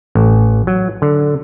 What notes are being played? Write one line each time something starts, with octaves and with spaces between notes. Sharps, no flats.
A1
F#3
D3